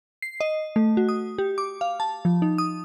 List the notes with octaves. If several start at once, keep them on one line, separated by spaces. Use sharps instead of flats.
C7
D#5
A3
F#4
D#6
G4
D6
F5
A5
F3
D#4
D#6